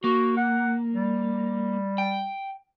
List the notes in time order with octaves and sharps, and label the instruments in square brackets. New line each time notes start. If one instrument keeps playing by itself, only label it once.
[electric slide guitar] A#3 [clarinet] F#4
[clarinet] F#5
G3
[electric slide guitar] G5